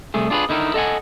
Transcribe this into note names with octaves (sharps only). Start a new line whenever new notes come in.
C2 A3 G#4
D4 F4 G#4 A#4 B4
D3 D#4 E4 A#4
A4 D#5 F5 F#5 G#5